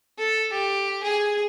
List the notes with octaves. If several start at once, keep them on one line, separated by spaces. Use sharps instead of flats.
A4
G4
G#4